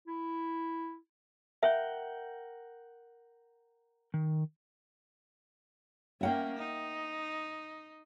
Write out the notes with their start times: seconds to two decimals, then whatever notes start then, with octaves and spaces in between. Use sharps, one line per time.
0.07 E4
1.63 A#4 E5 F#5 G5
4.14 D#3
6.21 A#3 C#4 E5 F#5 G5
6.57 D#4